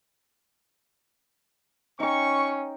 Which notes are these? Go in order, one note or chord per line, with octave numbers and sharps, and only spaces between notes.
C#4 D#4 G5 C#6